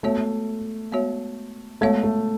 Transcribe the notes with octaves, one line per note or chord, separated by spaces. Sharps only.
G#3 A3 B3 F#4 C#5 E5
G#3 B3 F#4 C#5 E5
G#3 A3 B3 F#4 C#5 E5
A3